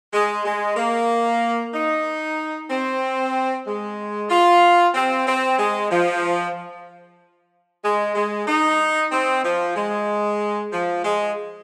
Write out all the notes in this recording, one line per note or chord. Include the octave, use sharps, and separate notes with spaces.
G#3
G#3
A#3
D#4
C4
G#3
F4
C4
C4
G#3
F3
G#3
G#3
D#4
C4
F3
G#3
F3
G#3